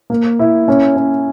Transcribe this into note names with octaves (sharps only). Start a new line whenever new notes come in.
A#3
E4
C#4
C#4